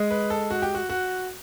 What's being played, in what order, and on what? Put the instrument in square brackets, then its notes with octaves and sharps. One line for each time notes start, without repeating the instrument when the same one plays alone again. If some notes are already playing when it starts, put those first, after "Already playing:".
Already playing: [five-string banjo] G#3
[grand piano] B4
A4
F#4
G4
F#4
F#4